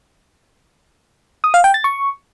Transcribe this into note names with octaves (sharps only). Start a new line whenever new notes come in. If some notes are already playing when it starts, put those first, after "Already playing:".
D#6
F5
G5
A6
C#6